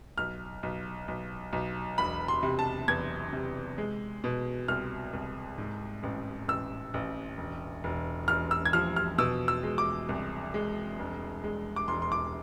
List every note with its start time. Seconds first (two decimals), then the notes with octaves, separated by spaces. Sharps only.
0.18 B1 F6
0.63 B1
1.08 B1
1.53 B1
1.98 E1 B5
2.28 C6
2.43 C3
2.59 A5
2.88 E2 G#6
3.33 C3
3.78 G#3
4.24 B2
4.68 C2 F6
5.13 C2
5.58 G#2
6.03 A1
6.48 A1 E6
6.94 A1
7.38 E1
7.84 E1
8.28 E1 F6
8.51 E6
8.65 G#6
8.73 F3 F6
8.96 F6
9.18 B2 E6
9.48 E6
9.63 G#3
9.78 D6
10.09 C2
10.54 G#3
10.99 E1
11.44 G#3
11.76 D6
11.88 E1 C6
12.02 C6
12.12 D6